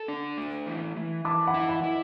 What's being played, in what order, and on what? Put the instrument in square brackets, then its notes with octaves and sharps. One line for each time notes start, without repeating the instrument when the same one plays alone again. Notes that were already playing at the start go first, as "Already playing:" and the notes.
Already playing: [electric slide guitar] A4
D4
A3
E3
E3
[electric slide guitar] E3 [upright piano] A5 D6
[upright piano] F#5 B5
[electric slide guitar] E4
[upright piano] F#5 B5
[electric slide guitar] E4